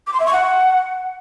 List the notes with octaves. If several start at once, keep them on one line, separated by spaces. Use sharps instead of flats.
D6
C6
E5
C#6
F#5